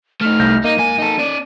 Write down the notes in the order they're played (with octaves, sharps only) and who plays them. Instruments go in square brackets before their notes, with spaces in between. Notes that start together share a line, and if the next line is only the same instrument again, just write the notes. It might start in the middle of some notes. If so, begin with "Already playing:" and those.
[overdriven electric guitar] A3 D#4 [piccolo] F6
[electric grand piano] C2 G6 A#6
[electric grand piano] A#3 [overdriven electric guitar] D#4 [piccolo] D#7
[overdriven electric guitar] G#2 G#5
D#4 A4
C#4 D5